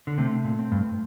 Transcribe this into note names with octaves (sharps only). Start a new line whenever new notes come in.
D3
C3 A3
A#2
C4
G2